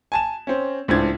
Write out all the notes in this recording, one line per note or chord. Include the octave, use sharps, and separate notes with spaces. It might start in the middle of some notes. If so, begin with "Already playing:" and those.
G#5 A5 E7
C4 C#4
C#2 A2 C4 D4 G#6